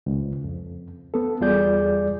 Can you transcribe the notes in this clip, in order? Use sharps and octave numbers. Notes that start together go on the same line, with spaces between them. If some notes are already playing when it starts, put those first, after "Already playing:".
C#2
F2
B3 A4
E2 G3 F4 G#4 D5 G6